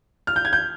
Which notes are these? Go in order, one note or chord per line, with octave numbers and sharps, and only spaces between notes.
F6
G6
G#6
G6